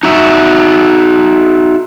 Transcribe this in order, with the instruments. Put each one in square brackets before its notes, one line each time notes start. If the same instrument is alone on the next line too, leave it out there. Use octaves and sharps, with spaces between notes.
[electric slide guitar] D#4 F#4 E5